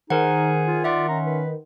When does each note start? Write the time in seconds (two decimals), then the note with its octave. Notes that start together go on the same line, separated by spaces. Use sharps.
0.10 D#3 D#4 G#4 A#4 C5 F#5
0.67 F4
0.84 D5 E5 F#5 C6
1.09 C#4 A#5
1.25 B4